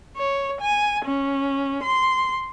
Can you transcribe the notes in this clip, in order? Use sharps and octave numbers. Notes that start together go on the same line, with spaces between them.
C#5
G#5
C#4
C6